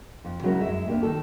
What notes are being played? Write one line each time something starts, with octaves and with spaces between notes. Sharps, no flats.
F2
C#3 F#3 G#3 C#4 E4 A#4
F#2 G#3 E5
E2 C3 A#3 D4
D#3 A4